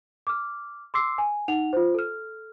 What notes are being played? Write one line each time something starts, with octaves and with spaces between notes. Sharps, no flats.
D6 F6
C6 D6 E6 C7
G#5
D#4 F#5 F7
F4 C5
A4 F6